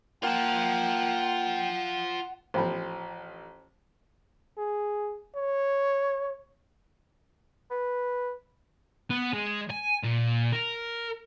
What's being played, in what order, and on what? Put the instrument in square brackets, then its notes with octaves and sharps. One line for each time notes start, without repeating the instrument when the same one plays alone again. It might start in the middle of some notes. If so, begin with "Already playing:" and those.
[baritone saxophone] A#3 [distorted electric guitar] F4 A5 [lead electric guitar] F#5 [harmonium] G5
[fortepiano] A1 F3 [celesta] C5 G5 B5
[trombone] G#4
C#5
[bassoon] B4
[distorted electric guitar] B3
G#3
G#5
A#2
A#4